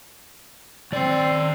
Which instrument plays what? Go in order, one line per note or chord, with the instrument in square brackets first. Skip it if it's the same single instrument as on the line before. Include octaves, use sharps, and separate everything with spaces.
[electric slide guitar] D#3 D5 [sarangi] C4